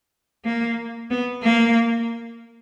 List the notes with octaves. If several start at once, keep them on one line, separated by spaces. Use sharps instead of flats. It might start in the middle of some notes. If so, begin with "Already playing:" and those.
A#3
B3
A#3